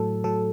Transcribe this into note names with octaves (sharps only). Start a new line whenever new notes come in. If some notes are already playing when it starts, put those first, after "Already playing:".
Already playing: A2 F#3 A4
A2 F#3 A4